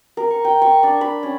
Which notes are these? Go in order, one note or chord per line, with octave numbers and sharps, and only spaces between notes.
A#4
C#6
G5
C#6
D4
B5
C#4